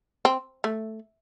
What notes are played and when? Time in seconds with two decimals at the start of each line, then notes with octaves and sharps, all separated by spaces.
0.25 C4
0.64 A3